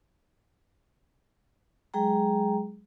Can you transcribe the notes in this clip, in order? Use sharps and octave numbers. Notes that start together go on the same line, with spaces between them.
F#3 G#3 G#4 G5 A#5